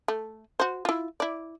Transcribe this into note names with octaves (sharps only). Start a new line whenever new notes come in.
A3
F#4 C5
E4 F4
E4 D5